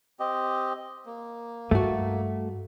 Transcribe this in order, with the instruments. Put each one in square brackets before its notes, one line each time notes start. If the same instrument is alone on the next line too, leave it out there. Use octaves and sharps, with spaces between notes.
[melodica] C4 G4 D#5
A#3
[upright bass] G2 [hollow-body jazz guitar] A3 F#4